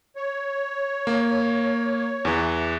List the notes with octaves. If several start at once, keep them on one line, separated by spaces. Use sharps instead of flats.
C#5
A#3
E2 E3